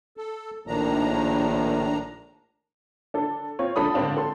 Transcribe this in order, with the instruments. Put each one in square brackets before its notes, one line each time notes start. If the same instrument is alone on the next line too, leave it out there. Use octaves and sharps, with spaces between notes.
[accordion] A4
[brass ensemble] A#1 A2 [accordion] D#3 D4 A#5
[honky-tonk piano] D4 A4
C4 F4 C#5
C#2 F3 D4 A4 B5 D#6
G#1 D3 C4 D4 F5
A4 C6